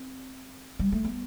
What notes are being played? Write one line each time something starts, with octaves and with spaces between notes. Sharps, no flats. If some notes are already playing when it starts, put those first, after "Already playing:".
Already playing: C4
G3
A3
B3